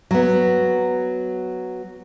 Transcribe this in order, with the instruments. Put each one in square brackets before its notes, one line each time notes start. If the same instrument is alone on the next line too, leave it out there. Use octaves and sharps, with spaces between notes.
[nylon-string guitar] F#3 B3